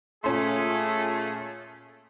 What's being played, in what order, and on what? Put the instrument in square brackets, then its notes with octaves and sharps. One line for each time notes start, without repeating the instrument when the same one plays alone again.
[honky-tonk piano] A#2 C#4 C6 [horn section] A3 G#4